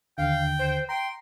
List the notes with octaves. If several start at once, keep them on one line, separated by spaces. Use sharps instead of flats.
D#2 D3 F5 G5
C5
G5 A#5 C6